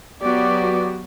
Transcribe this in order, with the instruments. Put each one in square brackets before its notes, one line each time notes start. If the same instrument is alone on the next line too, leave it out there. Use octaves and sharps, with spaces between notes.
[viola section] F#3 B3 [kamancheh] F#4 G4 [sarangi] D5